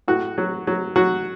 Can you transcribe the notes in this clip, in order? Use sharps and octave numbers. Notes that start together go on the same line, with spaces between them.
A2 F#4
F#3
F#3
F#3 F#4